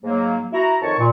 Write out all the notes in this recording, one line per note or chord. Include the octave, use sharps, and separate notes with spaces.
G#2 F#3 A#3
E4 F#4 A#5
F2 D#3 C#5 A5 C#6
A#2